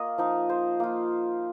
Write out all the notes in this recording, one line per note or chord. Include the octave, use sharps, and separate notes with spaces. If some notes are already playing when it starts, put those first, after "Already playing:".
Already playing: A#3 F4 D#5
F3 D#4
C5
A#3 F4